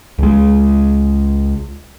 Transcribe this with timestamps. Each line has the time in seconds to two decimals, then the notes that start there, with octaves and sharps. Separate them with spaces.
0.18 C#2 G#3